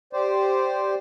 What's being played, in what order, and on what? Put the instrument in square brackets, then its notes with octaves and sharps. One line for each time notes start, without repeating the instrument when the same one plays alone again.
[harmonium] G4 C5 D5